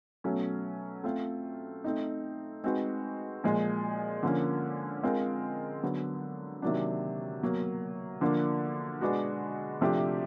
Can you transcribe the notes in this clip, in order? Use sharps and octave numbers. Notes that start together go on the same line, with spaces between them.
B2 F#3 A3 C#4
A3 C4 F4
A3 C4 D#4
G#3 C4 D#4 F#4 B4
A#2 F3 G#3
D3 F3 A#3 C#4
G#3 C4 F4 A#4
D3 F#3 B3
C3 D#3 F#3 A#3 D4
B2 F#3 A#3
D3 F3 A#3 D4
B2 G#3 B3 D4 F#4
C3 F3 A3 D4 G4